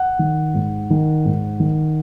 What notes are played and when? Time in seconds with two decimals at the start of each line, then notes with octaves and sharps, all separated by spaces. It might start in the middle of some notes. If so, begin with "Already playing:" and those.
Already playing: F#5
0.19 D#3
0.54 G#2
0.90 D#3
1.25 G#2
1.60 D#3